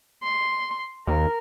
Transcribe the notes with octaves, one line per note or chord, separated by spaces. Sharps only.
C6
D#2 A#4